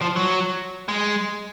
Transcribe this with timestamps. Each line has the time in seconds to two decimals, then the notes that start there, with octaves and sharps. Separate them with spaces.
0.01 F3
0.16 F#3
0.88 G#3